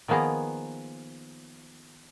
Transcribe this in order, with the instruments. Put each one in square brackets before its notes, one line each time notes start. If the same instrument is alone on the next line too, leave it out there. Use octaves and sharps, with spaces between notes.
[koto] D#3 F3 A#3 B3 G#4 A#5